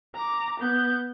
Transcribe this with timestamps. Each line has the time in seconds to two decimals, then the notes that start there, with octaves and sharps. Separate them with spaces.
0.15 A#5 D6
0.60 B3 G6